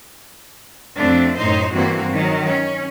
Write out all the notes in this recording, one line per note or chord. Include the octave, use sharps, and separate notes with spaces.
F2 A3 C4 D4
F#2 A2 D#4 C5
G2 E3 A#3 C4 F#4
D#3 F#3
C#4